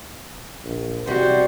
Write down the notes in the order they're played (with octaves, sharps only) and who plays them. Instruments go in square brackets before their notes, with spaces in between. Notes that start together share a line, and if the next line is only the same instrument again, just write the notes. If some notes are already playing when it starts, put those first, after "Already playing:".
[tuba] A#1
[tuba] C3 [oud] G3 [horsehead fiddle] F#4 C5